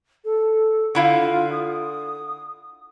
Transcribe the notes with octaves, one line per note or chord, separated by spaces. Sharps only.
A4
D3 E4 F4 F5
D#6